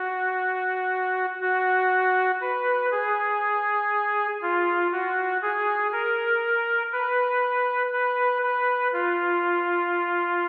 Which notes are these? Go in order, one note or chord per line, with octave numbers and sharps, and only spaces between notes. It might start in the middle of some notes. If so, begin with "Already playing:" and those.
Already playing: F#4
F#4
B4
G#4
F4
F#4
G#4
A#4
B4
B4
B4
F4